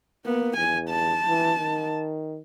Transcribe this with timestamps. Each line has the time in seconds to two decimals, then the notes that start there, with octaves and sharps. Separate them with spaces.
0.25 A#3 B3
0.57 E2 G#5
0.90 A5
1.27 E3
1.58 D#3